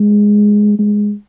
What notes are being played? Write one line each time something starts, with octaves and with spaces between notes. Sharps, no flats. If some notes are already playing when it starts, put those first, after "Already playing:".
Already playing: G#3
G#3